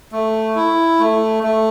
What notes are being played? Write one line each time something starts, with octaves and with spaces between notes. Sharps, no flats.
A3
E4
A3
A3